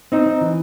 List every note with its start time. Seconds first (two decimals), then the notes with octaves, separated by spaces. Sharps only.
0.12 C4 D#4
0.27 C4
0.41 E3